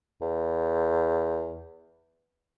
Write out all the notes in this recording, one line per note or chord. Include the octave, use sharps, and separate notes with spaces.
E2